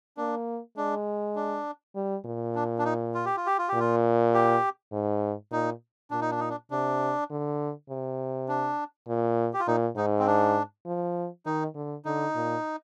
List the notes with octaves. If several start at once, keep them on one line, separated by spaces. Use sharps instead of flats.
A#3 D4
G#3 D4
D4
G3
A#2
D4
D4
D#4
F4
G4
F4
G4
F4
A#2 G4
F4
G4
G#2
A#2 D#4
A#2 D4
D#4
D4
D#4
D4
C3 D4
D3
C3
D4
A#2
G4
F4
A#2 D#4
G#2 D#4
C4
D4
F3
D#3 D#4
D3
D3 D#4
A#2